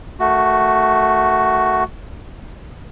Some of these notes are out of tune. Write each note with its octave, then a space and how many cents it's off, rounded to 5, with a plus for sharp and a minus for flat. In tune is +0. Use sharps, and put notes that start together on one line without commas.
D#3 -5 A3 +0 F#4 +5